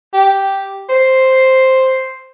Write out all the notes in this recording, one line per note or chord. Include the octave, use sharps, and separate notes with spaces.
G4
C5